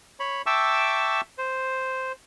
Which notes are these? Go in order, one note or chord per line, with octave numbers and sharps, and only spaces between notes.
C#5 B5
E5 G5 A5 C#6 D6 E6
C5